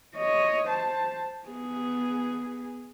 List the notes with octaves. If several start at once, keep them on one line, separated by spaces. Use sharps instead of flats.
C#5 D#5
C5 A5
B3 G#4